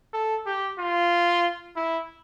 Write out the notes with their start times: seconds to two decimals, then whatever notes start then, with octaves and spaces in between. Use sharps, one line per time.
0.14 A4
0.46 G4
0.78 F4
1.76 E4